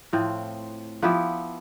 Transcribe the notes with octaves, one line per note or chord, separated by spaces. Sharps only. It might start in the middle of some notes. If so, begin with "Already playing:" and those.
A2 F3 C4
F3 B3 E4 G4